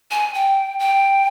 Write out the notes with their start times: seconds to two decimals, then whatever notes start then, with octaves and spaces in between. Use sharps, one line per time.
0.11 G#5
0.34 G5
0.79 G5